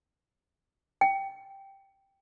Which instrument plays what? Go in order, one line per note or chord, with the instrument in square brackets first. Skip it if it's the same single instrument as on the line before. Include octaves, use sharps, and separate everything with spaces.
[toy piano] G5